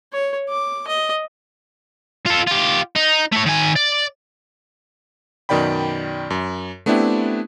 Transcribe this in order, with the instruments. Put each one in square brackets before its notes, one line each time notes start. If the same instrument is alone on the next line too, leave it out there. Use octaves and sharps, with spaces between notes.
[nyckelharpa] C#5
D6
D#5
[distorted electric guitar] F4 A4
F4 G4
D#4
A3 C#5
D#3 G#5
D5
[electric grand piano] F#2 B2 D#3 D5 G5 B5
F#2
A3 B3 C4 D4 E4 G4